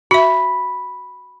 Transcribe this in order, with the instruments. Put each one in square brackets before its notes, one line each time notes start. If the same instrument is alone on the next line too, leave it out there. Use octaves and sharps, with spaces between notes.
[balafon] F#4 E5 [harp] B5